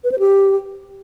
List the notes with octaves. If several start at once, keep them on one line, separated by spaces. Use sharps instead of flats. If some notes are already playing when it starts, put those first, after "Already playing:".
B4
C5
G4